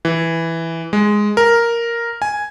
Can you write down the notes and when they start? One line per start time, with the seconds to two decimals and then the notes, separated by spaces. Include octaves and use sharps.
0.05 E3
0.93 G#3
1.37 A#4
2.22 G#5